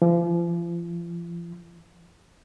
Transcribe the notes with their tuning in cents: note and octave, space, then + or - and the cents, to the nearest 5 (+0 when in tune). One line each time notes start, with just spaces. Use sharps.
F3 -35